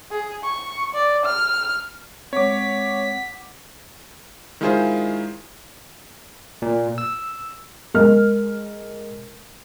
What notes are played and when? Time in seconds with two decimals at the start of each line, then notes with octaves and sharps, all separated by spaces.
0.11 G#4
0.44 C#6
0.94 D5
1.25 F6
2.33 G#3 C4 C#5 F#5 D6 B6
4.61 D#3 G#3 E4 F4 G#4 C5
6.62 A#2
6.98 E6
7.94 G#3 A#4 F6